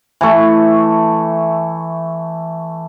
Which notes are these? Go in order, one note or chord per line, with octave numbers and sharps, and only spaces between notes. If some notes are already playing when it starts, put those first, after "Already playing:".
E3 A3